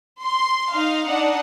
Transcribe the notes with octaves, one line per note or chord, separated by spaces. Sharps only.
C6
D#4 F5
D4 D#4 F#5